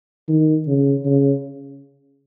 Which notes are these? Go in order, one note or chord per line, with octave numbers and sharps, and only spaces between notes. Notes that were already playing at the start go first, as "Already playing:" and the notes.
D#3
C#3
C#3